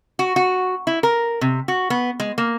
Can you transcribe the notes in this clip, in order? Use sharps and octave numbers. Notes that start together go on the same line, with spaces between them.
F#4
F#4
E4
A#4
C3
F#4
B3
G#3
A#3